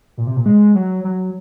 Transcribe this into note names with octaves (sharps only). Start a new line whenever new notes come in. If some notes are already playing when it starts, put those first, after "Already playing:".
A#2
C3
A#2
G#3
F#3
F#3